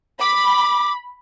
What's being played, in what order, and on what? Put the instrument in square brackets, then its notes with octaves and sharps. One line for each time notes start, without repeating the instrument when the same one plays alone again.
[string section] B5 [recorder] D6